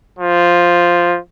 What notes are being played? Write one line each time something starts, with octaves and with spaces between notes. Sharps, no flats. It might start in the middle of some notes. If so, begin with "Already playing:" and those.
F3